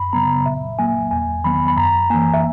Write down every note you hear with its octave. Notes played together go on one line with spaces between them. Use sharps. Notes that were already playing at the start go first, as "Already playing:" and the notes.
Already playing: F#2 B5
C#3 F#3 B3 A#5
A#2 E5
F#3 A#3 G#5
E2 G#5
D#3 F#3 B3 B5
B5
F#2 A#5
E3 A#3 G#5
E5